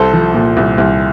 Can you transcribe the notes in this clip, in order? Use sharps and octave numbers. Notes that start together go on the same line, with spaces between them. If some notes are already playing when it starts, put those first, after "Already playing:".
Already playing: C2 A4 C5
F3
A#2
C2
C2